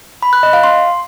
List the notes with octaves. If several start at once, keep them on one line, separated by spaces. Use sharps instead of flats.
B5
F#6
D#5
F5
C6